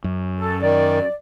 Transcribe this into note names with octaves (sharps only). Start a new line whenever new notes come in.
F#2
A4
D#3 D5